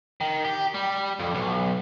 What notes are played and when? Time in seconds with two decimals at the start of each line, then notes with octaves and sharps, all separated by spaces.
0.21 D#3
0.44 G4
0.74 G3
1.19 F2
1.35 B1